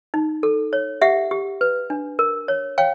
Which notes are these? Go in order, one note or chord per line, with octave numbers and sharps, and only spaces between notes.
D#4
A4
C#5
G4 E5 F#5
G4
B4
D4
A#4
C#5
C#5 F5 G5